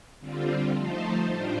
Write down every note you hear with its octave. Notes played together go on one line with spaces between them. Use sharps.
D3 G3 C4 F4
F3 A3 D#4 A4 C5
A2 G3 D4 F4 C5